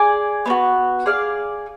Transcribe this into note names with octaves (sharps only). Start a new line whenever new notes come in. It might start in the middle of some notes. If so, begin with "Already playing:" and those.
Already playing: G#4 D5 G#5
B3 D4 F#4
G#4 D5 F5